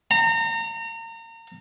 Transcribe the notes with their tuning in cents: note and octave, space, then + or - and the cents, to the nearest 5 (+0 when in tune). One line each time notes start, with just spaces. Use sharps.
A#5 -35